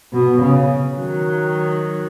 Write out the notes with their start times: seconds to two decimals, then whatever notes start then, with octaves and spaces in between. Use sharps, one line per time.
0.14 B2
0.43 C#3
1.00 D#3 F#3